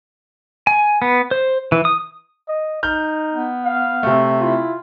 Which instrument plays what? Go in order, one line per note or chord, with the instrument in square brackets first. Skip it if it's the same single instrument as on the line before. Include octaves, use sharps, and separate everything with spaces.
[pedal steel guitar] G#5
B3
C5
E3
D#6
[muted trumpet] D#5
[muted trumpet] D#4 [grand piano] F6 G6
[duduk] B3
[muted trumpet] F5
[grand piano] C3 A3
[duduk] E4 [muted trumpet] F4